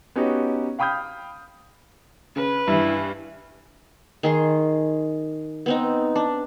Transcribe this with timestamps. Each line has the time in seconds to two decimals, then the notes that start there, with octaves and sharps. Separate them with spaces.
0.16 B3 C#4 D#4 F#4 G4
0.79 F5 G5 B5 D#6 F6 G6
2.36 C#3 B4
2.67 G2 E3 E4
4.23 D#3 G#4 C6
5.66 B3 C4 D#4
6.16 D4